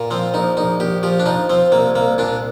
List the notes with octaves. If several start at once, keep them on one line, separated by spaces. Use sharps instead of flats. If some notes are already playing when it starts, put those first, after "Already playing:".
Already playing: A#2
F3 C4
A#1 D#4
A#1 D#4
A#1 G4
F3 G4
D4
F3 D#4
F3 C4
C2 A#3
C2 A#3
A#2 D4